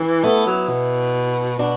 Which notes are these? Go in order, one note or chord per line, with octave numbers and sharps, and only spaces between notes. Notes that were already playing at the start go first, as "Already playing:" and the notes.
Already playing: E3
A3 B3 E4
F#3
B2
B2 D4 F#4